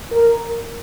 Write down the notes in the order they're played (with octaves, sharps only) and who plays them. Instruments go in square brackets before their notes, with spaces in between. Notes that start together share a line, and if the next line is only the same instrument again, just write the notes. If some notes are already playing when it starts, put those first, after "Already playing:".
[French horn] A#4